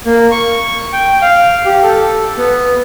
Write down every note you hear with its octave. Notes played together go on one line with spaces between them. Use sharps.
A#3
C#6
G5
F5
G4
A4
B3